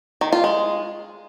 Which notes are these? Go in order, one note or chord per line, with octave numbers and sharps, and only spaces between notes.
D#3
F4
G#3